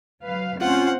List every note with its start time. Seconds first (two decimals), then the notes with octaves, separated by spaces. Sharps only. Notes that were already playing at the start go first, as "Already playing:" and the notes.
0.22 F#3 B4 F5
0.61 D2 C4 C#4 F4 C5 F#5